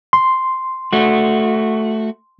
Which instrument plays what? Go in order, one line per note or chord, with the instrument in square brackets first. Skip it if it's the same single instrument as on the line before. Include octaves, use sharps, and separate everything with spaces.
[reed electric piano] C6
[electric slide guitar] A3 F#4